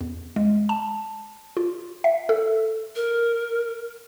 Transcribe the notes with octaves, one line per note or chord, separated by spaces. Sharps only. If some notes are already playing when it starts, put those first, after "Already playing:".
E2
G#3
A5
F4
E5
A4
A#4